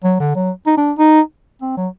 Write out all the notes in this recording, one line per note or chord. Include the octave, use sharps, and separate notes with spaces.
F#3
D3
F#3
D#4
D4
D#4
C4
F#3